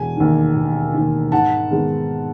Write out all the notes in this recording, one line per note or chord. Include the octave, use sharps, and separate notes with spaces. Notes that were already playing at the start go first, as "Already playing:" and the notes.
Already playing: E1 G#5
D#2 D#3
E1
D#2 D#3
G#2 F#5 A5
D#3 G#3 B3